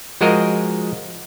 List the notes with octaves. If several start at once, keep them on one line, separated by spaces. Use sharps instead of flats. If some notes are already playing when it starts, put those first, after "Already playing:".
F3 G#3 F#4 G#4 A#4 D#5